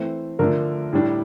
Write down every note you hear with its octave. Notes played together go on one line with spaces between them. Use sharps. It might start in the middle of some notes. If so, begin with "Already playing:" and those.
Already playing: E3 A3 C4 C5
D3 F3 A3 D4 A#4
A2 G3 D4